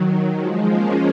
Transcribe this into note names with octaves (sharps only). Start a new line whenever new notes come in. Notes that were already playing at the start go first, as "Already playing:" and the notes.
Already playing: D#3 F#3
F3 G#3
A#3 C#4